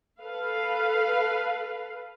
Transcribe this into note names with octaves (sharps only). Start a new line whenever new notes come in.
A4 B4 F5